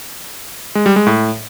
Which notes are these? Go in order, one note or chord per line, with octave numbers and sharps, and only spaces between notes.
G#3
G3
G#3
A2